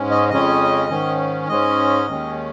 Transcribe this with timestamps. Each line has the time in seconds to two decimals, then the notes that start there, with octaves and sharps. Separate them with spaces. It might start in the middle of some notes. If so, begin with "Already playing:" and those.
Already playing: G#2 G#3 C#4
0.11 D#5
0.30 F2 C#3 G#3 C#4 D#5
0.89 G#2 D#3 C#4
1.49 G#2 G#3 C#4 D#5
2.08 D#2 D#3 G#3 C#4